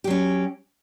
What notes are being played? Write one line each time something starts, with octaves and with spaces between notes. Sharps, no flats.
F#3 C#4 G4